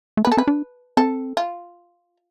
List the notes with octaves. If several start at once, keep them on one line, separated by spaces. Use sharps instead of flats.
A3
B4
B3
A4
C4 B4
D4
C4 A4
F4